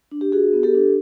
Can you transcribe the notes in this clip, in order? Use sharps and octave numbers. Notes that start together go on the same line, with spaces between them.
D4
G4
D4 F#4 G#4
B3
G4 A4
D4